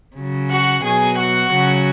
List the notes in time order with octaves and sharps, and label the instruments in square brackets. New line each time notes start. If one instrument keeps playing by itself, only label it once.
[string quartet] C#3 F#3
F#4 F#5
B2 F#3 G#4 G#5
F#4 F#5
C#3 F#3